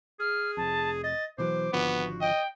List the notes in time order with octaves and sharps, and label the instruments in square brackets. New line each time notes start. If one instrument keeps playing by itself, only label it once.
[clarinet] G#4 [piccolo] F6
[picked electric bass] F1 F2 [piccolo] A5
[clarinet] D#5 [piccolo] A6
[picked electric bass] B2 E3 F#3 [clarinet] C5 [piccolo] D6
[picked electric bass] G#1 D3 F3 [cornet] B3 [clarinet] F#4
[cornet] D#5 [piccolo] G5